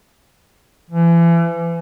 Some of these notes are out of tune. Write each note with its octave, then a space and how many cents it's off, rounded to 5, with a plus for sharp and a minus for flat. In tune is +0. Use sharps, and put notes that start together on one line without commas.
E3 +35